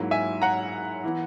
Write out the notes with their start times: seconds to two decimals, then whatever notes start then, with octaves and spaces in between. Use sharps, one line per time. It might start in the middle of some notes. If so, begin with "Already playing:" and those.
Already playing: G#2 F#3 A#3 E4
0.11 E5 G#5
0.42 F#5 A#5
1.04 E3 B3 E4